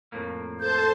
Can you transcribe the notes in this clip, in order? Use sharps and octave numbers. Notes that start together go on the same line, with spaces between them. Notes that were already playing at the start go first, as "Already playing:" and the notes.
F2 A2 A#3
A4 C5 A5 G6